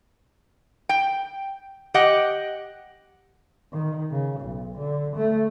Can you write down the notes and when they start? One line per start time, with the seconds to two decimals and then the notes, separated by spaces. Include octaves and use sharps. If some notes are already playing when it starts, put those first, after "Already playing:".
0.89 G5
1.94 G4 D#5 F#5
3.73 D#3
4.11 C#3
4.41 B1
4.78 D3
5.16 A3